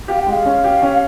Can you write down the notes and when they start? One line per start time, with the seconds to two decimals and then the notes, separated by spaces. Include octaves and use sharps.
0.08 G4 F5
0.19 G5
0.27 G#3 F5
0.46 C#4
0.64 G4
0.82 C#4